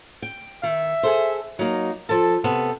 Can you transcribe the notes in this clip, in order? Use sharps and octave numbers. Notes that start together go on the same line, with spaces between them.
G5
D#3 E5
G#4 A4 C5
F#3 A#3 D#4
F3 A4 A5
C3 B3 A4 A5